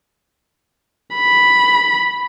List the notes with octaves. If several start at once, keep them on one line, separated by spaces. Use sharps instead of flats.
B5